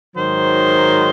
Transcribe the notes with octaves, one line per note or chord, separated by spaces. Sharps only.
G#2 D#3 F#3 C5